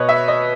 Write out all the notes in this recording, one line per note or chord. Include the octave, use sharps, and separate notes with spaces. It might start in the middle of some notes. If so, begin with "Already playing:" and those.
Already playing: B2 B4 C#5 D#5
E5
D#5